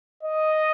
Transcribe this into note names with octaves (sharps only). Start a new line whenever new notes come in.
D#5